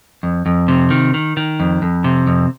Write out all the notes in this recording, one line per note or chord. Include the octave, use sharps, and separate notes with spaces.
F2
F2
C3
D#3
D#3
D#3
F2
F2
C3
F2